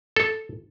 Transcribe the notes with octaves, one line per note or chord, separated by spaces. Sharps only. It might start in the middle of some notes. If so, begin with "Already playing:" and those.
A4